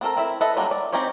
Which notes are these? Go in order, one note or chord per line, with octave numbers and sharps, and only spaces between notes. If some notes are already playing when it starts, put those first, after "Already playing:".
B3 C4 A4 A#4
C4 E4 E5
A4 B4 D#5 E5
F#3 G3 A#3 D4 F4
D5
C4 C#4 D#4 G4 C#5